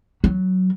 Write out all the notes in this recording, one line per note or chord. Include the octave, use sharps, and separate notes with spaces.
F#3